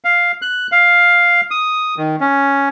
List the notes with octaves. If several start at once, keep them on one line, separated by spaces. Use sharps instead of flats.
F5
F#6
F5
D#6
D#3
C#4